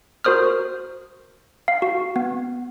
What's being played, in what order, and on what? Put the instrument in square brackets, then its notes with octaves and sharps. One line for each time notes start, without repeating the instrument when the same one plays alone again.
[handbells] F#4 A#4 C5 D#6 F6
F5
F#4
B3